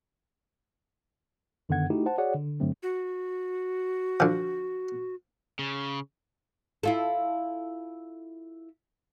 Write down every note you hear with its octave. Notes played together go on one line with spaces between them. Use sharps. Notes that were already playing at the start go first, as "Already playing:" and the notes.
F#2 D3 D#3 B3 F#5 G#6
A3 D#4 E4 F#4 G4
C5 F#5 A5
F#4 G#4 C#5 D5 F#5
D3
G2 D3 F#3 A3 C4
F#4
D3 F3
C#3
E4 F4 A4